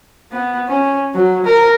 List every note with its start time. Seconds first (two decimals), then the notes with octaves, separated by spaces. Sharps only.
0.32 B3
0.69 C#4
1.14 F#3
1.45 A#4